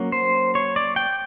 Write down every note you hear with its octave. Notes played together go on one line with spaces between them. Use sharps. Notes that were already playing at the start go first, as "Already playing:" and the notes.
Already playing: F#3 A#3 C#4
C5
C#5
D5
G5